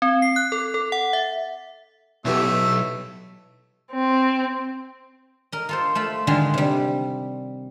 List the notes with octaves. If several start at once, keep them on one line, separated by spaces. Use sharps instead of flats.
C4
C7
F#6
A4
A4
F#5
E5
B1 E3 A3 B3 G4
C4
A#4 D#5
F4 A4 C5
A3 F4 B5
D3 D#3 G#3 F4
C3 G3